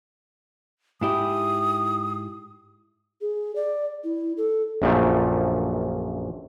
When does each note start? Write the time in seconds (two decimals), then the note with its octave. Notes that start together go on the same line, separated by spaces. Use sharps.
1.01 G#2 E4 G4 D#6
3.21 G#4
3.56 D5
4.04 E4
4.37 A4
4.82 A#1 F#2 A#2 F3 A3